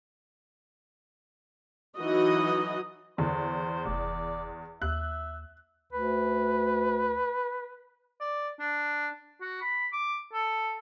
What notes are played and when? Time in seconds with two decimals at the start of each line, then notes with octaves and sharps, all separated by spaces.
1.96 E3 F#3 D#4 F#4 D#5
3.18 E2 D3 C5
3.86 F1 D5
4.82 D#2 E5 F#6
5.93 D2 B4
8.20 D5
8.59 D4
9.41 F#4
9.62 B5
9.92 D6
10.33 A4